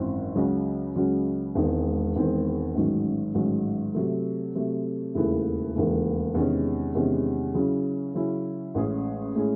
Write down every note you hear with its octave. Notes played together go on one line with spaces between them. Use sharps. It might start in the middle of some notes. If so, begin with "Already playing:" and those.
Already playing: G#1 F#2 E3 C4
C#2 C#3 F#3 C#4 F#4
C#2 C#3 F#3 C#4 F#4
E1 E2 D#3 G#3 C4
E1 E2 D#3 G#3 C4
A1 G#2 D#3 F#3 C#4
A1 G#2 D#3 F#3 C#4
C3 F#3 A3
C3 F#3 A3
E1 D#2 C#3 E3 A3
E1 D#2 C#3 E3 A3
E2 C3 D#3 G#3 C#4
E2 C3 D#3 G#3 C#4
C#3 F#3 C#4 E4
C#3 F#3 C#4 E4
A1 A2 G#3 C#4 G#4
A2 G#3 C#4 G#4